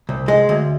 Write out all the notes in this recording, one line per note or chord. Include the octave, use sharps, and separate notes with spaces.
C2
G#3
D2